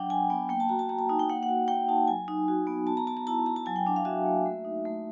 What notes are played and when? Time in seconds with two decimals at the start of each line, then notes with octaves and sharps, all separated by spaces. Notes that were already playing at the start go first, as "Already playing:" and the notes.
Already playing: F#3 D4 F#5 G5
0.10 F#3 G#5
0.30 B3 G5
0.49 A#3 G5
0.60 A5
0.69 F#4 A#5
0.79 A5
0.89 A#3 A#5
0.99 A5
1.09 D#4 G#5
1.19 G5
1.29 A#3 F#5
1.43 F#5
1.49 F#4
1.68 A#3 G5
1.88 D#4 A5
2.07 F#3 G#5
2.28 D#4
2.48 F#4
2.67 B3
2.87 B3 A5
2.97 A#5
3.07 B3 A5
3.17 A#5
3.27 E4 A5
3.46 E4 A#5
3.56 A5
3.66 F#3 G#5
3.76 G5
3.87 D4 F#5
3.96 F5
4.05 F#4 E5
4.25 A#3
4.46 A3
4.65 D#4
4.85 A3